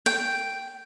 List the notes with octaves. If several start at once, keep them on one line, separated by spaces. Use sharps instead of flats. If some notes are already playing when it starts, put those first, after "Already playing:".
G5